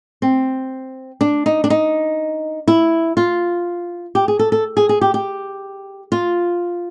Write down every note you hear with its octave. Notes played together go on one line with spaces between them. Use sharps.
C4
D4
D#4
D4
D#4
E4
F4
G4
G#4
A4
A4
G#4
G#4
G4
G4
F4